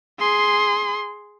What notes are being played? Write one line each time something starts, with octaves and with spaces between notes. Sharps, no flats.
G#4 C6